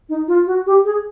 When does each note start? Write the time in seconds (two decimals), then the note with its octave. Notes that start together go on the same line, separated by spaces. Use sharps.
0.09 D#4
0.28 F4
0.46 F#4
0.66 G4
0.85 G#4